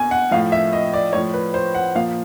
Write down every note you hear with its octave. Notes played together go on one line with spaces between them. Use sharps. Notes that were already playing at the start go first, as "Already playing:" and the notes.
Already playing: B2 G#5
F#5
A2 F3 F5
E5
D#5
D5
A2 F3 C#5
B4
C5
F#5
A#2 F3 F5